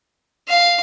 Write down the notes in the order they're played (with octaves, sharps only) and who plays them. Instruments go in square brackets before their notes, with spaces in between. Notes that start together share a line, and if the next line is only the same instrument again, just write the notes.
[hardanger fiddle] F5